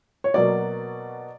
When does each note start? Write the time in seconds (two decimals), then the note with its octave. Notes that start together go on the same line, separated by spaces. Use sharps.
0.24 C#5
0.34 B2 F#3 A#3 D5